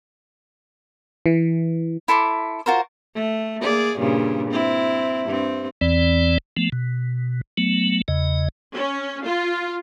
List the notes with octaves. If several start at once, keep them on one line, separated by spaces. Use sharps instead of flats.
E3
E4 A4 C6 D6
F4 F#4 A#4 C5
A3
A#3 G#4 D5
G2 A#2 C#3
C4 E4
G2 C4
E2 E3 C4 D5
F3 A3 B3
B2
F#3 A3 B3
E2 C#3 D#5
C#4
F4